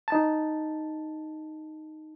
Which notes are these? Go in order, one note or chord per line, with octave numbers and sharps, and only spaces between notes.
D#4 A5